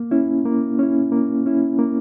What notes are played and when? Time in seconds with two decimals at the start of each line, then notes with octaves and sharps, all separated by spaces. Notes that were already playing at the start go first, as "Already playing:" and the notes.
Already playing: A#3
0.11 C#4 E4
0.45 A#3
0.79 C#4 E4
1.12 A#3
1.46 C#4 E4
1.79 A#3